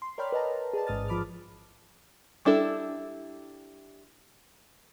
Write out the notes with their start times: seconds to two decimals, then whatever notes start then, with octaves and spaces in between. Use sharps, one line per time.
0.02 C6
0.18 A#4 C#5 D5 G5 B5 F6
0.32 B4 D#5 A5 A#5
0.74 G#4 D5 A5
0.87 A1 G#2 D#6 F6 A6
1.08 F3 B5 D6 F6
2.45 G3 D4 E4 A4